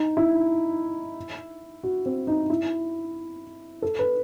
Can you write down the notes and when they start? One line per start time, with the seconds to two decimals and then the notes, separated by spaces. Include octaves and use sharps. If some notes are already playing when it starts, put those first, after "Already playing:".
Already playing: D#4
0.17 E4
1.83 F#4
2.06 C4
2.27 D#4
2.50 E4
3.82 A4
3.99 B4